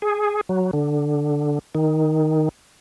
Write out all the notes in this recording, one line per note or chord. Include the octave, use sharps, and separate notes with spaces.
G#4
F#3
D3
D#3